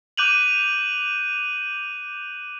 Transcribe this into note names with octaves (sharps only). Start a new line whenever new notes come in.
D6 F#6 G6 D#7 F7 F#7